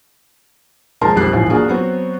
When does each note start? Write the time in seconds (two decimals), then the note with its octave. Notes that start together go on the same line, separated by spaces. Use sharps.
1.01 D#2 F3 G#3 A#4 A5 C6
1.16 B1 F2 C4 G4 F#6 C7
1.32 D#1 A1 E3 F3 F4
1.50 A#3 D4 F4 F#4 G#4
1.68 F#3 B3 C4 F#4